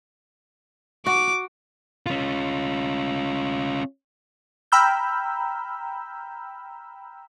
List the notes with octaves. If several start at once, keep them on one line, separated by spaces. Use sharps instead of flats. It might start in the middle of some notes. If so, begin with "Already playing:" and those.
F#4 D6
C#4 F4
G5 A#5 B5 E6 F6 G6